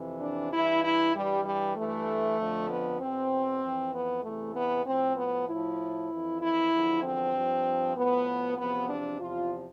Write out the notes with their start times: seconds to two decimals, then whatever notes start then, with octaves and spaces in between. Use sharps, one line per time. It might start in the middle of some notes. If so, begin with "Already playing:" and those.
Already playing: F2 C3 E3
0.21 D4
0.52 G2 E3 E4
0.83 E4
1.14 G2 E3 G3
1.45 G3
1.76 G2 E3 A3
2.38 F2 D3 F3
2.70 B3
3.00 E2 B2 C4
3.62 F2 E3
3.93 B3
4.24 E2 C3 E3 A3
4.56 B3
4.86 A2 F3 C4
5.17 B3
5.48 A2 F3 E4
6.10 F2 E3
6.41 E4
6.72 E2 D3 F3
7.03 C4
7.34 G2 F3
7.96 A2 F3 B3
8.58 E2 C3 F3 B3
8.89 D4
9.20 E2 C3 F3 F4